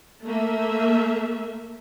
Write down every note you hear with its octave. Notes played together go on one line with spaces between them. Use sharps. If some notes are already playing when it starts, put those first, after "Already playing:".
A3 A#3 E5